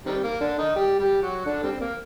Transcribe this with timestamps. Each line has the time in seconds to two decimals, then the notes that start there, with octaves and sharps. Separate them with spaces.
0.06 C3 D#3 G3
0.24 A#3
0.41 D3 D4
0.58 D#3 D#4
0.76 G3 G4
0.99 G3 G4
1.22 F#3 F#4
1.45 D3 D4
1.63 G3 C4
1.80 A#3